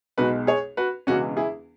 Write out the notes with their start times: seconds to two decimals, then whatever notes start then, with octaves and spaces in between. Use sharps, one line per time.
0.17 B1 B2 G#3 F#4 B4
0.47 G#4 C#5
0.77 F#4 B4
1.07 E1 E2 C#3 E3 G#3 C#4 F#4
1.37 E4 G#4